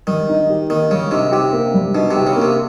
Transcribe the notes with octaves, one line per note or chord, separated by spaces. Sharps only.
D#3 G3
D#4
G4
D#3 A#3
C#3 G3
C3 D#4
C3 G4
A#3
G3
B2 D#4
C3
G4
C#3
A#3
C3